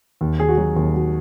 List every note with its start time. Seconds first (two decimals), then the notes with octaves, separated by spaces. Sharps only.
0.21 D#2
0.39 D#2 G#4
0.49 F#4
0.57 F#3
0.76 D#2
0.94 F#3